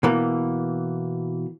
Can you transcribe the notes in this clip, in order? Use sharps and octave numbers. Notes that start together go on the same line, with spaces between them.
B2 E3 A#3